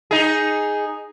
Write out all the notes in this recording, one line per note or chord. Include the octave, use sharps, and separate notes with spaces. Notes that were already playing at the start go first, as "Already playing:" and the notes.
D#4 G#4